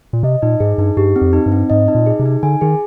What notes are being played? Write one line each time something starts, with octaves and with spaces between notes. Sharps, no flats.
A#2
C3 D#5
A#2 D#4
G#2 G#4
G2 D#4
G2 G4
C4
F2
D#4
G2
C4
G#2 D#5
D#4
A#2
G#4
C3
D#4
D3 G#5
D#3 G#4